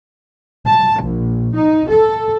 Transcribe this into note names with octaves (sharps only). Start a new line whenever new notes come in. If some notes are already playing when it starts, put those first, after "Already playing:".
A5
A#1
D#4
A4